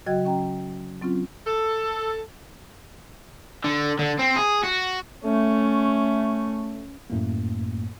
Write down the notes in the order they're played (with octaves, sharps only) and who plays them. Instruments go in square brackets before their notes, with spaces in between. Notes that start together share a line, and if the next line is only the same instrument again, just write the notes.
[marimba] C#3 F#3 F#4 D#5 G5 G#6
C#4 G5 A#5
F#3 C4 C#4 F4
[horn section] A4
[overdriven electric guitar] D3
D3
C4
G#4
F#4
[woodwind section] A3 [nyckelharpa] C#4
[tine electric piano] F#2 A2 A3 A#3